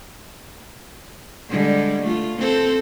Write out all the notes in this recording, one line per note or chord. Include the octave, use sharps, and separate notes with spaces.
D3 G3 G#3
A3 F4
C4 A4 C5